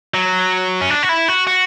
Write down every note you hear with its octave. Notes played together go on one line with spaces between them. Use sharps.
F#3
C#4
D4
F#4
E4
F#4
F#4